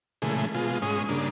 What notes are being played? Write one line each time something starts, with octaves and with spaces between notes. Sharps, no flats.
A#2 C#3 E3 G#3 A3
B2 G#3 F4
G#2 G#3 C#4 D#6
G2 C#3 A#3 D4